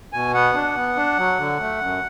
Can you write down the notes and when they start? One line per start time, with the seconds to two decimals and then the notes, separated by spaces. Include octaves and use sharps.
0.13 B2 G#5
0.34 B3 F#5
0.55 D4
0.76 B3
0.96 D4
1.18 F#3
1.38 D3
1.60 A3
1.81 F#2